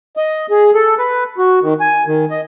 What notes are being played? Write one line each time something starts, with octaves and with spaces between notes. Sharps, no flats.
D#5
G#4
A4
B4
F#4
D#3
G#5
D#3
D#5